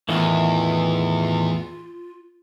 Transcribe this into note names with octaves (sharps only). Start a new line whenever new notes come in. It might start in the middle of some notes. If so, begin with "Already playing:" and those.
E2 A2 D#3 E3 F4